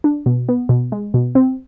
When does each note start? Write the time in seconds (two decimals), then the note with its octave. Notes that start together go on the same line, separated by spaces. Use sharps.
0.04 D4
0.26 B2
0.49 B3
0.69 B2
0.92 G#3
1.14 B2
1.35 C4